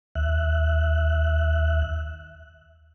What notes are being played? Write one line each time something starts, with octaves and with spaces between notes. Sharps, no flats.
D#2 E5 F#6